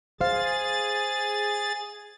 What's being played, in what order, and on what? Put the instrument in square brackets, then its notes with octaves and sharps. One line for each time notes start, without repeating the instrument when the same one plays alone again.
[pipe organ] G#4 A6 [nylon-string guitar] C5 F5